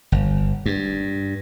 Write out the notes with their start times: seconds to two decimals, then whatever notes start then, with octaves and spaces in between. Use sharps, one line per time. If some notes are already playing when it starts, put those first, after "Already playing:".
0.12 G1
0.66 G2